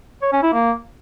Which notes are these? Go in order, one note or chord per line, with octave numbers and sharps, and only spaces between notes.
C#5
C#4
E4
A#3